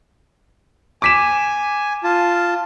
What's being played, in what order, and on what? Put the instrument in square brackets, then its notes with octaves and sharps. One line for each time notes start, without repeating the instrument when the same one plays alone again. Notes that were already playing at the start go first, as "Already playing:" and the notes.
[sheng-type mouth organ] G#5 [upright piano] D6 B6 E7
[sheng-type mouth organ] F4 A5